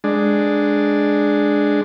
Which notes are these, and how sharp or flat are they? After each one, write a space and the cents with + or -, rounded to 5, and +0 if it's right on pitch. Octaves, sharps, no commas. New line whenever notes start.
G#3 +0 D4 +5